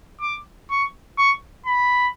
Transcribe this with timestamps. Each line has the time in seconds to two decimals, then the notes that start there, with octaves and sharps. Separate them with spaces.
0.21 D6
0.70 C#6
1.18 C#6
1.66 B5